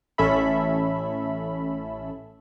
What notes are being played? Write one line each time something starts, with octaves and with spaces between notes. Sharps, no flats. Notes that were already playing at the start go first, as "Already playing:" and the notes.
A1 C#4 A4 E5 B5